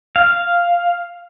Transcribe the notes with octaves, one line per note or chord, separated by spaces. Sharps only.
F5